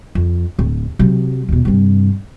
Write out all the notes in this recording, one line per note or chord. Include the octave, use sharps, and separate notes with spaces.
F2
D1
C3 F#3
D#2 B2
G2 C3